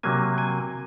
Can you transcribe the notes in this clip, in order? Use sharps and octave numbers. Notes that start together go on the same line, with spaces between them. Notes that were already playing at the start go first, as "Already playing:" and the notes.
C3 F#3 A#3 G#5
G#5